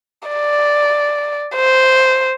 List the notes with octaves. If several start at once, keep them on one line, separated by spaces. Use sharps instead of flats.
D5
C5